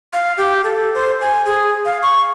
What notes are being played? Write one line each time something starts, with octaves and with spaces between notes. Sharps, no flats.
F5
G4
A4
C5
G#5
G#4
F5
C#6